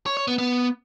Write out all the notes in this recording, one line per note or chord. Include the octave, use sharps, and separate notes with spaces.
C#5
C#5
B3
B3